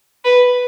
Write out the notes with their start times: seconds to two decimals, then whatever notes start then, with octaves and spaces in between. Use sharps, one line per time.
0.25 B4